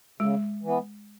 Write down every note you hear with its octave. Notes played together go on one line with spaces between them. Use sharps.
C#3 G#3
E3
B3